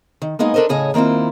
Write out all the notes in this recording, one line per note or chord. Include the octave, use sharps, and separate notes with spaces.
D#3
G#3 A#3 B3 D#4 G#4
D4 A4 A#4 C5 D#5
A2 C#3 G#4 A4 C#5 D#5
D#3 A#3 C4 E4 F4